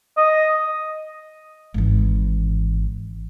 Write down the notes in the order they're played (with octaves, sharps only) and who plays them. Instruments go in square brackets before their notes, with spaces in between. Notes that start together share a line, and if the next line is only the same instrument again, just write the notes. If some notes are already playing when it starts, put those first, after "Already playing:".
[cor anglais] D#5
[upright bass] G#1 E3